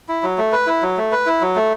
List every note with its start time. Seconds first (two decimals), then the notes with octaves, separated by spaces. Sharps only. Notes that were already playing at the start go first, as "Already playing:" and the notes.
0.09 E4
0.23 F#3
0.38 A3
0.52 B4
0.67 E4
0.82 F#3
0.97 A3
1.12 B4
1.26 E4
1.41 F#3
1.56 A3